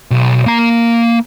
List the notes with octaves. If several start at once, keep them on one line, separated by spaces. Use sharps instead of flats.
B1
A#3 A#5